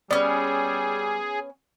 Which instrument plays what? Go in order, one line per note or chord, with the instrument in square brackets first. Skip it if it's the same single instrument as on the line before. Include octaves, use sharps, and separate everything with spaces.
[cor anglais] G3 [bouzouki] B3 C#4 [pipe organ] G#4 [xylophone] D5